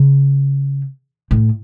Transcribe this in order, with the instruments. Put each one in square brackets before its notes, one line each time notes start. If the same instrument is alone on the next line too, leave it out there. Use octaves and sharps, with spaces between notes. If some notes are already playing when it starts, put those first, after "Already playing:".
Already playing: [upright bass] C#3
A2